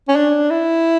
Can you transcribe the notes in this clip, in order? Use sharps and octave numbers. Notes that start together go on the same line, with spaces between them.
C#4
D4
E4